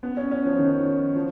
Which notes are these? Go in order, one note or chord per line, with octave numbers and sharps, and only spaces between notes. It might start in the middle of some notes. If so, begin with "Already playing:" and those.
B3
C#4
C#4
F3
D#3
F3